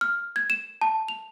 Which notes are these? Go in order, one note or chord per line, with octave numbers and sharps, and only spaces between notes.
F6
G#6
E7
A5
F7